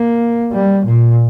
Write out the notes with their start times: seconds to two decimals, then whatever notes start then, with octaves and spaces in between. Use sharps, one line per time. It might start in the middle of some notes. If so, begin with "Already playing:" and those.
Already playing: A#3
0.53 G3
0.85 A#2